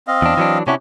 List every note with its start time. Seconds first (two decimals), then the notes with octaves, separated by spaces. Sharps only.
0.08 C4 D#5 F5
0.22 E2 D4
0.37 E3 F#3 D4
0.67 C3 C#4 D4 E4 F#4 G4